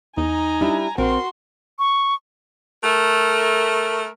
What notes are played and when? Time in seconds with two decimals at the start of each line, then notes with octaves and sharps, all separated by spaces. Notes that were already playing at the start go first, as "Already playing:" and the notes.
0.17 E2 D#4 G#5 A#5
0.61 G3 D4 E4
0.98 A#1 C4 F#4 A#4 C6
1.79 C#6
2.84 A3 A#4